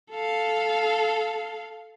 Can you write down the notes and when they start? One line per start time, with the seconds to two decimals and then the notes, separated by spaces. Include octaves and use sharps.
0.11 A4 F5